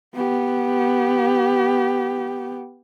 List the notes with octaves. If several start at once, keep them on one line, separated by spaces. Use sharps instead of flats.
B3 G4